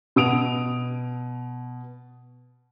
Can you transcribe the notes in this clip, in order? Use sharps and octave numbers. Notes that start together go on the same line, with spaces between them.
B2 D#6 D7 F7